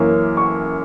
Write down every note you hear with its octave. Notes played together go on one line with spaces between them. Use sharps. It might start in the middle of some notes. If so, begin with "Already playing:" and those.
Already playing: F#2 E3 A#3 C#4
C#6